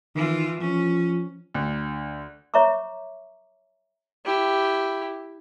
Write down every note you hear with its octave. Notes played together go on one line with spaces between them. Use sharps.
D#3 E3 F4
F3 C#4
D2
C#5 E5 A#5 C#6 D6
E4 G4